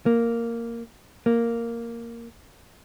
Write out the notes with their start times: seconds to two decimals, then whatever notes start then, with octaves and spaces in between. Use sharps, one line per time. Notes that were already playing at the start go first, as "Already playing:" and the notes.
0.06 A#3
1.26 A#3